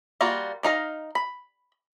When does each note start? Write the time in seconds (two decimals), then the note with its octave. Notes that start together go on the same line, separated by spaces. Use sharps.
0.21 G3 A#3 F4 F#4
0.63 D4 D#4 F5 A#5
1.15 B5